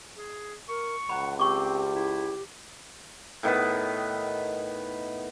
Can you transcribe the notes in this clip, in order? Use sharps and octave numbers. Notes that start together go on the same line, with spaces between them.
G#4
A#4 C#6
C#2 F#5 A#5 B5
C4 G4 C#6 D6
E4
A2 D#3 B3 B4